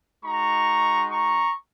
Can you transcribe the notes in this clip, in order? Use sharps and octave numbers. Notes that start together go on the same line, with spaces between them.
G#3 D#4 F#4 A#5 C#6
A#5 C#6